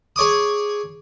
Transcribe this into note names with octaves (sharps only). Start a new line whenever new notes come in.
G#4 C#5 D6 D#6